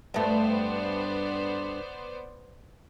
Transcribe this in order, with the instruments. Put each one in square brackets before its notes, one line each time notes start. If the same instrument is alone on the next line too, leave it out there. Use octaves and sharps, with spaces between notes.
[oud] G2 A3 [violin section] B3 C5 D5